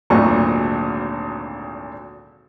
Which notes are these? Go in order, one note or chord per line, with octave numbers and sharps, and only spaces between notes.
G#1 D2 A#2 F#3 C#6